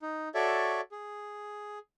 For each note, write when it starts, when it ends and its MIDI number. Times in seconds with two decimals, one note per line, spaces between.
0.02 0.29 63
0.35 0.81 66
0.35 0.81 69
0.35 0.81 73
0.35 0.81 74
0.35 0.81 76
0.92 1.79 68